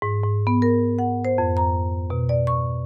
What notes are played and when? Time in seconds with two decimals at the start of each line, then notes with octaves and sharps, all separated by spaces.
0.02 G#2
0.24 G#2
0.47 B3
0.62 A#4
0.99 F#5
1.25 C5
1.38 F2
1.57 A#5
2.10 B2
2.29 D5
2.47 C#6